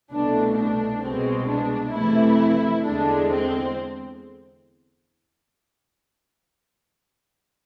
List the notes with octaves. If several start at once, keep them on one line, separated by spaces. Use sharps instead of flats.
C2 B2 A3 D4
D4
C2 B2 G#3 C4
D4
F2 C3 E3 A3 E4
E2 D3 G#3 D4
C4